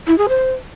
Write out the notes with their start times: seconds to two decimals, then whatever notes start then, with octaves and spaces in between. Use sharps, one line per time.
0.07 E4
0.18 G#4
0.29 C5